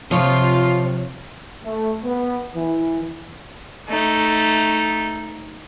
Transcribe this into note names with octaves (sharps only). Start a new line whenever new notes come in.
C3 F3 F4 C#5
A3
B3
E3
A3 D#4